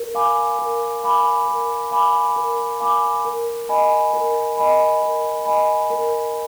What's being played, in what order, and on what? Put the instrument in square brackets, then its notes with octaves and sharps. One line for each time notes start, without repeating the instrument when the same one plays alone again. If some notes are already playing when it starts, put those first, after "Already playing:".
Already playing: [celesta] A#4
F5 G#5 B5 D6
A#4
F5 G#5 B5 D6
A#4
F5 G#5 B5 D6
A#4
F5 G#5 B5 D6
A#4
D#5 G#5 B5
A#4
D#5 G#5 B5
A#4
D#5 G#5 B5
A#4